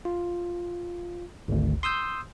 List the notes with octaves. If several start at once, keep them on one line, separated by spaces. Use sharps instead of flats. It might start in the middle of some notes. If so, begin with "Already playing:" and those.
F4
G#1 D2
C6 D#6 E6 G6